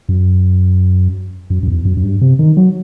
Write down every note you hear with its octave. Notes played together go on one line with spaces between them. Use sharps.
F#2
F#2
F#2
E2
F#2
F#2
G2
C3
D#3
F#3